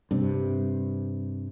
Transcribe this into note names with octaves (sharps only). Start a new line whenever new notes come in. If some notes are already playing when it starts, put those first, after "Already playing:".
G2 C3